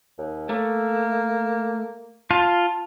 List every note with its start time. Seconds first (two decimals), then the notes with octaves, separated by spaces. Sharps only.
0.18 D#2
0.49 A3 A#3
2.31 F4 A5